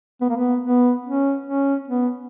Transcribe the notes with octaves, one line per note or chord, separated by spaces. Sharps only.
B3
A#3
B3
B3
C#4
C#4
B3